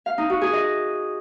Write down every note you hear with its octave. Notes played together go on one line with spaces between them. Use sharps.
F5
D#4
F#4
G#4
D#5